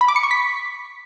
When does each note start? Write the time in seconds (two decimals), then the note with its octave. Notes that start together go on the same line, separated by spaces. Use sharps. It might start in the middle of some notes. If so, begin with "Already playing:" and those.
0.01 B5
0.08 D6
0.16 C#7
0.23 C#6
0.31 B6